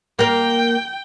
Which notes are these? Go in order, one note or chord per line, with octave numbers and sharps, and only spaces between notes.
A#3 A#4 G5